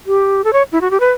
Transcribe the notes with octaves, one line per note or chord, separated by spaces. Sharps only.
G4
A4
C#5
E4
F#4
G4
B4